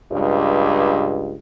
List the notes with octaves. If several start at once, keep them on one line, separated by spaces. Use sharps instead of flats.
C#2 G2